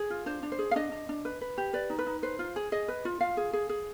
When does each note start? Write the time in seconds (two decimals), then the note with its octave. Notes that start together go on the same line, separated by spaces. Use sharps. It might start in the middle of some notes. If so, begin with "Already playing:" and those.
Already playing: G#4
0.10 F4
0.26 D4 C5
0.43 D4
0.52 C5
0.59 G#4
0.71 F5
0.76 D4 D#5
0.92 D4
1.09 D4
1.25 B4
1.41 B4
1.58 G4
1.73 B4 D5
1.90 D#4
1.99 B4
2.07 D#4
2.23 B4 C5
2.39 F4
2.56 G#4
2.72 G#4 D#5
2.88 B4
3.05 F4
3.20 F4 F5
3.37 G#4
3.53 G#4
3.69 G#4